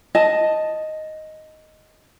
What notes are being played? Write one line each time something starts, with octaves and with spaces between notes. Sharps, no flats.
D#5 A5